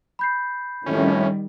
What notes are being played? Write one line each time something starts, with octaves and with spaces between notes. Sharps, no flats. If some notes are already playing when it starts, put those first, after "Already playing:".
B5 G6 C7
F2 A2 D#3 G3 C#4